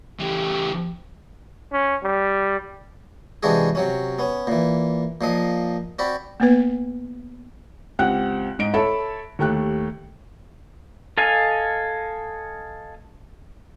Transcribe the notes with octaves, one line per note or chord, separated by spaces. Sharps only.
C#3 E3 G4
C#4
G3
C3 E3 G#3 D4 F#4 G#4
C3 F#3 C#4
B3 C#4
A#2 E3
A#2 F3 D#5
C4 F#4 D5 B5
A#3 B3 B4
C#2 C4 G4 F#5 F#6
G#2 D#5 D7
A4 C#5 E5 A5 B5
D#2 A3 G4 F#6
A4 D#5 F5 G#5